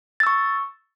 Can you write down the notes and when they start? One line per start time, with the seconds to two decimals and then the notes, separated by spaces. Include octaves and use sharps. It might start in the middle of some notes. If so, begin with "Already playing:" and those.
0.20 A6
0.23 E6
0.27 C#6